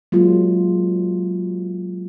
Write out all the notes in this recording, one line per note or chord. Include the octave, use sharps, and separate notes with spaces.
F#3 G#3 A#3 F4